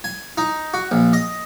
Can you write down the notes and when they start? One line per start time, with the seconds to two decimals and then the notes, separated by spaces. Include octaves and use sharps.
0.04 G#5
0.38 D#4
0.74 F#4
0.91 A#1
1.13 D#5